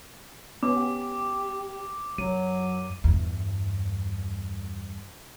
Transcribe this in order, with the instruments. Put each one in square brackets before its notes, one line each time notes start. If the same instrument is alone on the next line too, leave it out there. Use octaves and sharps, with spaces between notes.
[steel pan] B3 C#4 [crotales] D6
[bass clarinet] G4
[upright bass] F#2 [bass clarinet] F#3 [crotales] D#7
[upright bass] E2 G2